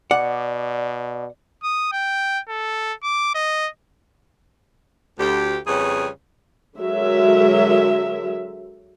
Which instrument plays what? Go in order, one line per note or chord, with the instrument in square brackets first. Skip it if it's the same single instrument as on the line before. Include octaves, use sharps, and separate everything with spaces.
[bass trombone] B2 [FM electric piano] D5 [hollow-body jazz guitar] F#5
[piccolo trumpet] D#6
G5
A4
D6
D#5
[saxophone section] D2 G4
F2 C#3 G3 C#4 G#4 B4
[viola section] D3 F#3 G#3 A#4 E5